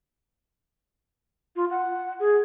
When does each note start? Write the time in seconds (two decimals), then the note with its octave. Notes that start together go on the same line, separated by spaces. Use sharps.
1.56 F4
1.71 F#5
2.19 G#4